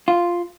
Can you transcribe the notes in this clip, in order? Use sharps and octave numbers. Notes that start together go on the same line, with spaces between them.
F4